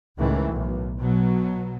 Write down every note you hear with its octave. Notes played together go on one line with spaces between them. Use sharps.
C#2 A2 D#3 E3
B1
B2 F#3